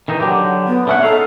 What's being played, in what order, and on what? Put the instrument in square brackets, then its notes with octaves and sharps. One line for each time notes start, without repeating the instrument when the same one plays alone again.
[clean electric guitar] D#3 E3 D#4
D3 F#3 G4
[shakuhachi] B3
[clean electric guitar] D3 C#4 F#5 [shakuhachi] E5
[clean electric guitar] D#4 F5 [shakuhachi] A4